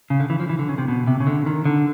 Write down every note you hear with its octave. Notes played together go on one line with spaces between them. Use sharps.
C#3
D3
E3
F3
E3
D3
C#3
C3
B2
C3
C#3
D3
D#3
D3